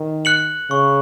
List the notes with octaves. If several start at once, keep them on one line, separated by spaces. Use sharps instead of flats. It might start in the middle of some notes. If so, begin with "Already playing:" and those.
Already playing: D#3
F#6 C#7 F#7
C#3 C#6